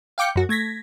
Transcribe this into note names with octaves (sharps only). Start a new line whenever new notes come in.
F5 G5 D6 G6 C#7
F#2 F#4
A3 G#6 A#6 B6